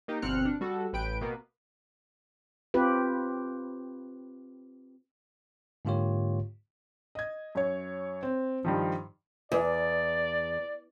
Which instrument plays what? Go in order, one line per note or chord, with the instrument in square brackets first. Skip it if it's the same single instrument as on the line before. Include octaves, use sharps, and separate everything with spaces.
[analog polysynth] A#3 D#4 G4
G1 B2 C4 F6 F#6 C#7
D4
G3 F#4 A4
A1 B4 G5 D7
B2 A#3 B3
[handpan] C4 F4 G4 B4
[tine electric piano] G#2 D3 A#3 F4 G4 C#5
[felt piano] D#5 G#6
F#2 C#5
C4
G2 D#3 F3
[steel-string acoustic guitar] E2 [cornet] D5